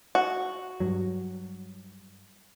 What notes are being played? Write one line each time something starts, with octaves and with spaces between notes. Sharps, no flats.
F#4
G2 F#3